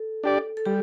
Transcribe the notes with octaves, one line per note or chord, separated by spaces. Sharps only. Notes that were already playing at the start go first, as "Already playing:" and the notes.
Already playing: A4
D4 G4 D5
A4
G3 G4